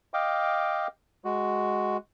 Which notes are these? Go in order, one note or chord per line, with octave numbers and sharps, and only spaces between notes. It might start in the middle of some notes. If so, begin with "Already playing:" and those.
D#5 F5 G5 D6
G#3 F#4